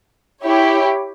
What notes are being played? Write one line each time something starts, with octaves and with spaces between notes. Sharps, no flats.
E4 G4 C#5